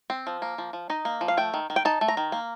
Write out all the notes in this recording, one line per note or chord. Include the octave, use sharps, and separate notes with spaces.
C4
F3
A#3
F3
F3
D#4 D#5
A#3
F3
F5
A3 G5
D#3
D#3
G5
D#4 A5
A3
A#5
D#3
A#3